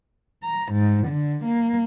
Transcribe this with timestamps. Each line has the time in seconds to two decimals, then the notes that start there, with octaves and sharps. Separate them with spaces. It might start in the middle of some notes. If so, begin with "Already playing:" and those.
0.44 A#5
0.73 G#2
1.08 D3
1.45 A#3